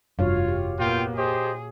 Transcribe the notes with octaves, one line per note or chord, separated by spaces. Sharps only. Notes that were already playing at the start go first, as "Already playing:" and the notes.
F1 G2 F4 F#4 C#5 F5
G4
A#2 A#3 B3 F4 G5
G4 G#4 C5 D#5